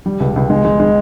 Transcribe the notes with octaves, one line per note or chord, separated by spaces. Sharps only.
G3
C#2
C#2
G#3
G#3
G#3